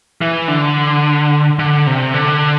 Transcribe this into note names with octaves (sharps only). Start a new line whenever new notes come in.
E3
D3
D3
C3
D3